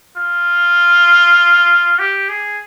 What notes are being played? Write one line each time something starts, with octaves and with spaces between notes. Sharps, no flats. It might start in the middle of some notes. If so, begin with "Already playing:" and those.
F4
G4
G#4